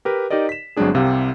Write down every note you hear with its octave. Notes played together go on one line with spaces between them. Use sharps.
G4 A#4 B4
D#4 G4 A#4 D5 D#5
B6 E7
G1 F#3 G#3 C4 D4 G#4
C2 C3 G4 F5